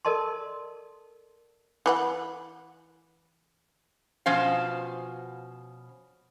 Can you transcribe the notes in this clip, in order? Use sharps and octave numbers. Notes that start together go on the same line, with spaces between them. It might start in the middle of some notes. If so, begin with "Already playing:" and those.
A4 A#4 D5 D#5 A5 C6
E3 B4 F#5
B2 F3 C#4 C5 F5